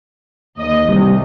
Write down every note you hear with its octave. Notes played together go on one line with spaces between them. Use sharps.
D#2 D#5
C2 C3 G3